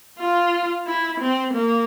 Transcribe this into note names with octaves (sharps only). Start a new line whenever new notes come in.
F4
E4
C4
A#3